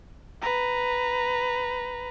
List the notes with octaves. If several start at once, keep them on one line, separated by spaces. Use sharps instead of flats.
B4 A#5